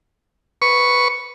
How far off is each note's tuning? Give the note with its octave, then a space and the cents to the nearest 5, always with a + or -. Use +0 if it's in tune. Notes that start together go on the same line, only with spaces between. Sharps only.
B4 +0 C#6 +0